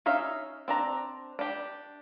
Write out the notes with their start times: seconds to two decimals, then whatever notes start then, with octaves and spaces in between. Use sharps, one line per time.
0.06 C#4 D#4 E5 F5
0.68 C4 D4 A#5
1.39 D4 G4